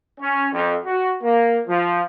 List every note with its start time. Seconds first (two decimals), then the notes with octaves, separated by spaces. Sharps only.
0.20 C#4
0.52 F2
0.85 F#4
1.23 A#3
1.68 F3